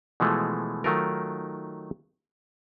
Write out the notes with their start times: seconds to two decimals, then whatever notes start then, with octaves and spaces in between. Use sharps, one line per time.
0.20 B2 E3 F3 G#3 A3
0.84 D#3 F#3 A3 D#4 F4 A#4